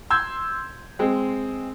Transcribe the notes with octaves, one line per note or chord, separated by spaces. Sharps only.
C6 E6 G6 G#6
G#3 C4